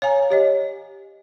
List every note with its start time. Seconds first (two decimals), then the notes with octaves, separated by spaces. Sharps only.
0.02 C#5 F5 G#5 A#5
0.30 G4 C#5 D#5